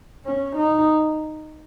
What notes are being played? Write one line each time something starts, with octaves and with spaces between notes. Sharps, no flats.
C#4
D#4